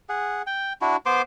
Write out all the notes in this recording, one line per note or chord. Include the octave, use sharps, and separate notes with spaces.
G#4 F#5
G5
D4 E4 F#4
B3 C5 C6 D6